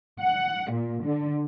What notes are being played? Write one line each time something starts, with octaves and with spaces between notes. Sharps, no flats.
F#5
A#2
D3